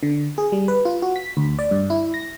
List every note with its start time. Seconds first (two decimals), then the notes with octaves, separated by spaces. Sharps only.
0.03 D3
0.38 G#4
0.52 G3
0.68 B4
0.85 F4
1.02 F#4
1.16 B6
1.37 D2
1.59 D5
1.71 G2
1.90 E4
2.14 A#6